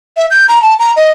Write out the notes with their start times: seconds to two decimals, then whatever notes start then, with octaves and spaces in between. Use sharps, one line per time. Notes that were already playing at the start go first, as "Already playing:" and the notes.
0.17 E5
0.31 G6
0.48 A#5
0.62 A5
0.79 A#5
0.96 D#5